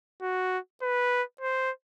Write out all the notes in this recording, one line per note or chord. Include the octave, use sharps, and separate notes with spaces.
F#4
B4
C5